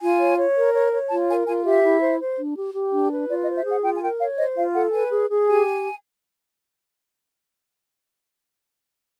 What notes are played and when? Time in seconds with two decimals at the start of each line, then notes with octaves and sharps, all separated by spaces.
0.01 F4 G#5
0.20 C#5
0.38 C#5
0.56 A#4
0.74 C#5
0.93 C#5
1.10 F4 A5
1.29 A#4 G#5
1.47 F4 G#5
1.65 G4 E5
1.84 E4
2.02 C5
2.20 C5
2.38 D4
2.56 G4
2.74 G4
2.92 D4
3.10 B4
3.28 F4 D5
3.43 D#5
3.46 C5
3.56 E5
3.65 G#4 F#5
3.83 F4 G5
3.95 G#5
4.02 A#4 G5
4.19 C#5 F5
4.37 C5 D#5
4.56 F4 F5
4.75 A4 F#5
4.92 B4 G#5
5.11 G#4
5.29 G#4
5.47 G4 G#5